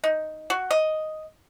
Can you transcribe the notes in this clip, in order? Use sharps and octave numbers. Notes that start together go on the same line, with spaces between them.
D#4
F#4
D#5